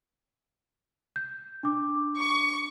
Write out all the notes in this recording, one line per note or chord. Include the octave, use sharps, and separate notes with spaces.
G6
D4 D6
C#6